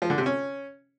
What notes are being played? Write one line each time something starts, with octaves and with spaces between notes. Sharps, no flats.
F3
D3
C3
C#4